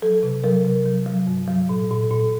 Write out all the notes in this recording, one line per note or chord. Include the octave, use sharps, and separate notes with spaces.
F#3 A4
C3
F#3 A#4
C3
F#3
F#3
G2
F#3
A#2
A#2
A#2